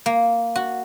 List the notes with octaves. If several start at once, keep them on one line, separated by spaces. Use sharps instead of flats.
A#3
F#4